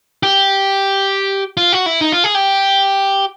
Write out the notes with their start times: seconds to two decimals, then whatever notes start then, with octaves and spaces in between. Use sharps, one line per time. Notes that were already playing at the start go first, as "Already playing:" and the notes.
0.23 G4
1.57 F4
1.72 F#4
1.86 E4
2.01 D#4
2.12 F4
2.24 G#4
2.35 G4